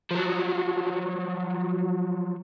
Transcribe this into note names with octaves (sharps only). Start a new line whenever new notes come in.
F3 F#3